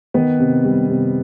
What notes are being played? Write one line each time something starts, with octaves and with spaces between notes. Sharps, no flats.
D#3 B3 B4
C3
G3
C3